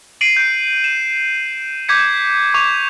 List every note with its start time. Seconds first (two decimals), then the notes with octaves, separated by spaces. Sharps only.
0.21 C7 D7 D#7 F#7
0.37 G6 D7
0.84 E7
1.88 D6 G6 G#6 B6 C#7
2.54 C#6 D6 F7